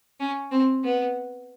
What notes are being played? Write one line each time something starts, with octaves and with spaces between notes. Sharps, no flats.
C#4
C4
B3